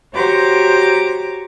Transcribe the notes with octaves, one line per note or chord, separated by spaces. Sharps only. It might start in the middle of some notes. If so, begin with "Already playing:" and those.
F#4 G4 C5 C#5 A#5 D6